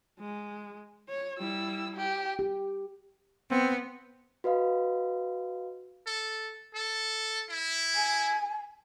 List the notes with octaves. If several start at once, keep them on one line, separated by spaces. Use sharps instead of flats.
G#3
C#5
G3 E4 E6
G4
G4
B3 C4
F#4 B4 D#5 F5
A4
A4
E4
G#5